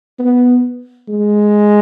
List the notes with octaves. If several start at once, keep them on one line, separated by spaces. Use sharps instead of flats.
B3
G#3